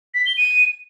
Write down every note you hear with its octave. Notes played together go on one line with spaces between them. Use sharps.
B6
G7
D#7